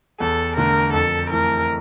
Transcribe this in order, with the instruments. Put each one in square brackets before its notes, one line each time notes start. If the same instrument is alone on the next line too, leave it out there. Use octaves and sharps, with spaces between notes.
[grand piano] E2 [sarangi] A4
[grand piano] D3 A3 [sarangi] A#4
[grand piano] F2 [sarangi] A4
[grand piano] E3 A3 [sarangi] A#4